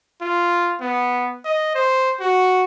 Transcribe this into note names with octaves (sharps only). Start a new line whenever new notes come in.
F4
B3
D#5
C5
F#4